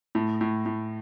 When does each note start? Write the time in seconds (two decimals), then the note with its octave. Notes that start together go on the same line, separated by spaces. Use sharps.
0.15 A2
0.41 A2
0.66 A2